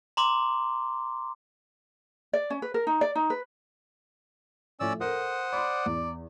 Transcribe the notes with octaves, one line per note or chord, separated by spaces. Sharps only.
A#5 C6 D6
D5
C#4
B4
A#4
D#4
D5
D#4
B4
A2 F3 A3 C#4 D5 E6
A4 A#4 C5 F#5 D#6
D5 B5 C6
E2